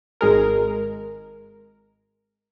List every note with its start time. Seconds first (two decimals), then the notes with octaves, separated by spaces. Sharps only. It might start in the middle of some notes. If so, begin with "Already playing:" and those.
0.21 G#1 G#3 A#4